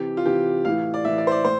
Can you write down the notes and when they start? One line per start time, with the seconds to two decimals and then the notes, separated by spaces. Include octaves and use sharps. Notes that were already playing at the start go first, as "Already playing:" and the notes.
Already playing: C3 E3 G4
0.17 F4
0.25 C3 E3 G4
0.65 A2 E3 F5
0.94 D5
1.05 A2 E3 E5
1.18 D5
1.27 C5
1.31 D5
1.45 A2 C5